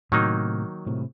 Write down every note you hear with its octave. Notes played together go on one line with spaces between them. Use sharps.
A2 C3 D#3 F#3 A#3 D#4
A2 C3